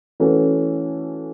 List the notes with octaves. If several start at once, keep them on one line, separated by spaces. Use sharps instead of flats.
E3 A3 C#4 F#4 A4